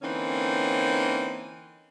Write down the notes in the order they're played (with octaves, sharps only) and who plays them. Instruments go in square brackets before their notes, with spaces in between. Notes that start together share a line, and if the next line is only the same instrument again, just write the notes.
[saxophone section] D3 E3 A#3 C4 C#4 D#4